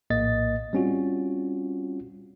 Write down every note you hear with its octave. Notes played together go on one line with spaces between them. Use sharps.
A#1 A2 A#3 D#5 A6
G3 C4 C#4 F4 F#4